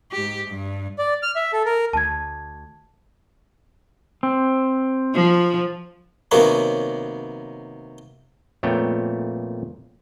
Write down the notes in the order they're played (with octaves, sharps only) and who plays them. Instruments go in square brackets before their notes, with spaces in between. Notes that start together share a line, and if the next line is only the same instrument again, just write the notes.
[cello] G#2 G4
G2
[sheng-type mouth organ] D5
F6
E5
A4
A#4
[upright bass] D2 [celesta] A5 G#6
[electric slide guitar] C4
[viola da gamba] F3
[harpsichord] C3 D#3 F#3 A#3 B3 C#4
[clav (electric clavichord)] F2 A#2 A3 B3 C#5 G5